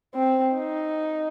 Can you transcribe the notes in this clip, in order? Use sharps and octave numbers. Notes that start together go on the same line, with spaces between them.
C4
D#4